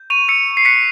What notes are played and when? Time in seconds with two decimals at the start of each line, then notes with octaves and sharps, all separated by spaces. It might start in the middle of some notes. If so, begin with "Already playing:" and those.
Already playing: G6
0.10 C#6 D#7 F7
0.28 E6 C#7 D#7
0.47 E6
0.57 C7
0.65 F#6 B6 C#7